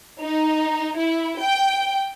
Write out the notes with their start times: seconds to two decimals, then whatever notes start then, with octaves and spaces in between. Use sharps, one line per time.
0.22 D#4
0.99 E4
1.40 G5